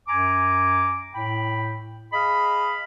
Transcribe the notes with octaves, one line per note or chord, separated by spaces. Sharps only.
F#2 G#5 A#5 D6
A2 G5 B5
G#4 D#5 F5 B5